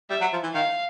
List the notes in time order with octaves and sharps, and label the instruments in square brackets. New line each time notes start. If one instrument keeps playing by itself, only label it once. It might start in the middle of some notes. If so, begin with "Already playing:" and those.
[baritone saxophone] G3 [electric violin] E5
[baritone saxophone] F#3
F3
E3
[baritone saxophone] D#3 [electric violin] F5